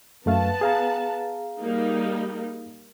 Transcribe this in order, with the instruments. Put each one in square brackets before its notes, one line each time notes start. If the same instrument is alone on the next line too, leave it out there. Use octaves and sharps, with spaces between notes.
[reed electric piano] F#2 A3 F5 [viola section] B3 A5
[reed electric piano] G#4 F5 A#5
[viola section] G3 A#3 D#4